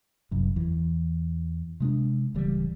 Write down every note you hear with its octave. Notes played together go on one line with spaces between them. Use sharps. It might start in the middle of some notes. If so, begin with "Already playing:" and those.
F#1 C2 F#2
E2 E3
C3 G#3 C4 D4
D1 C#3 E3 G3